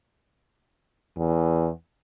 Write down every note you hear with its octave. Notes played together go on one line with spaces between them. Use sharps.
E2